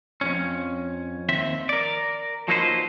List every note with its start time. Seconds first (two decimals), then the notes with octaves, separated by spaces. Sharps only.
0.21 F2 G#2 C#4
1.29 D#2 C4 E5
1.69 A#4 D5
2.48 F3 F#3 A#3 D#4 B4 C5